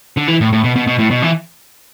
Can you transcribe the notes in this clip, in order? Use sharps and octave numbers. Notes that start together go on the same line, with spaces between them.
D3
E3
A2
A2
B2
B2
B2
A2
B2
E3